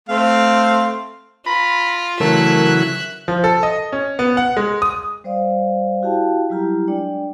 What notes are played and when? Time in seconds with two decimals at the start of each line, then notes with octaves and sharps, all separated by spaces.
0.09 A3 C4 F5
1.46 F4 A#5 B5
2.20 C#3 E3 F#3 A3 A#4 E5 F#6
3.28 F3
3.44 A4
3.63 D#5
3.92 C#4
4.19 B3
4.37 F#5
4.57 G#3
4.82 D#6
5.24 G3 C5 D5 F5
6.02 E4 F#4 G4 F5 G5 A5
6.50 F#3 G3 E4 F4 G4 A#5
6.87 G#3 D4 D5 G5